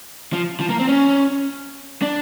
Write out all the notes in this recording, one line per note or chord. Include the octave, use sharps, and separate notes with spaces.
F3
F3
A#3
C4
C#4
D4